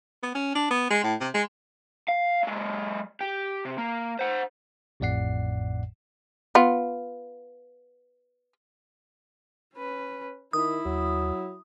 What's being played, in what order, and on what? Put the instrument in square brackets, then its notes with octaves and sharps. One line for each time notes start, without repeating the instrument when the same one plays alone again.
[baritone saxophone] B3
C#4
D4
B3
G#3
A2
C3
G#3
[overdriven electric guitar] F5
F#3 G#3
G4
C3
A#3
C5 F#5
[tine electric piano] A1 F2 A2 D5 F#5 C7
[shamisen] B3 F4
[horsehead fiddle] C#4 B4
[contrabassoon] D#3 [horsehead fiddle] E4 [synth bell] D#6
[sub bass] D#2 [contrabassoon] F#3